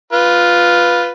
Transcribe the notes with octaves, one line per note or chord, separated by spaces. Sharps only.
F4 B4